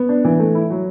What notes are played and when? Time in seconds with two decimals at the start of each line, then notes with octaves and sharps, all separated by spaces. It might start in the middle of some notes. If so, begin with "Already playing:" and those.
Already playing: B3
0.09 D4
0.25 E3
0.39 A3
0.55 E4
0.70 F#3